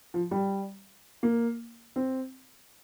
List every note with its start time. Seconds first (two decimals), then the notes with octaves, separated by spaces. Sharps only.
0.14 F3
0.31 G3
1.23 A#3
1.96 C4